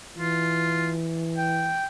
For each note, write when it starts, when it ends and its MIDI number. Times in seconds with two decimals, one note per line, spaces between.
0.17 1.80 52
0.17 0.93 65
1.37 1.86 79